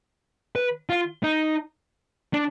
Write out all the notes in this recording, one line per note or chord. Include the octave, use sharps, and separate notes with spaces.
B4
F4
D#4
D4